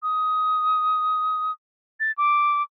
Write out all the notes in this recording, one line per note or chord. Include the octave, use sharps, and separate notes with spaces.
D#6
A6
D6